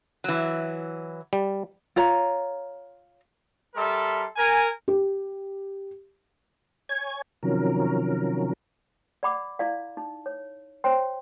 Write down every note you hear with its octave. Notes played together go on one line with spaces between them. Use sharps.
E3 F#3
G3
F4 C#5 A#5
G3 A4 A#4 E5 C6
A#4 G#5
G4
C#5 G#5 G#6
C3 D#3 F3 F#3 C#4 A#4
D5 F#5 B5 D6
E4 D5 F5
D#4
C#5
C5 C#5 G5 C6